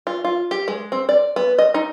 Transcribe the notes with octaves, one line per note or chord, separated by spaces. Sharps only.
F4
F4
G4
G#3
C4
D5
B3
D#5
D#4